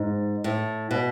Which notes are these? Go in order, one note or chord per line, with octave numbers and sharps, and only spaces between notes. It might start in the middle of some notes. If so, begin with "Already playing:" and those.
Already playing: G#2
A2
B2